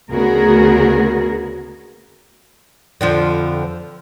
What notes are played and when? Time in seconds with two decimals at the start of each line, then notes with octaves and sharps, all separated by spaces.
0.12 D2 C#3 B3 F#4 G#4 A#4
3.01 F2 D3 F3